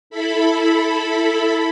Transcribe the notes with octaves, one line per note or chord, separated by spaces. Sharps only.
E4 A4 B5